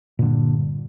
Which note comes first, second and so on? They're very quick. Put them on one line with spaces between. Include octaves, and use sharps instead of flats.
A#2 D3 G2